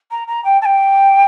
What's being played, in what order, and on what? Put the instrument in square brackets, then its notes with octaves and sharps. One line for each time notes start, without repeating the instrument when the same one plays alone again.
[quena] A#5
A#5
G5
A5
G5